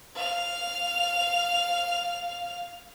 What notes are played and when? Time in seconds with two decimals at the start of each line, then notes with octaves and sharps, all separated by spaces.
0.15 F5 F7